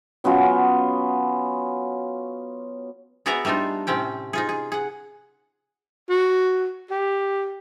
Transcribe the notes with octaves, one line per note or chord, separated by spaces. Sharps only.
F#3 B3 C#4 F4
B3 F#4 G#4 D5 E5 A#5
G3 A3 D4 D#4 F4
A2 C3 C4 C#4 G5
D#4 F4 G#4
G#4
G#4 F#5
F#4
G4